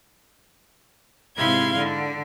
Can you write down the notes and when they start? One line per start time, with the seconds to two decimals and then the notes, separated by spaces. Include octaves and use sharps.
1.36 G#2 C3 E4 F5 C6 G#6
1.77 D3